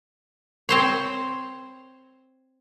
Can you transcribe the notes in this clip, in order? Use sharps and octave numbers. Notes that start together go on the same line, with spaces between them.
C4 C5 C#5